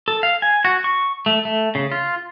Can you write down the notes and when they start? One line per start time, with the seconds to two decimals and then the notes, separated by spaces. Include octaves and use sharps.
0.08 A4
0.23 F5
0.42 G#5
0.65 F#4
0.84 C#6
1.26 A3
1.45 A3
1.75 C#3
1.92 F4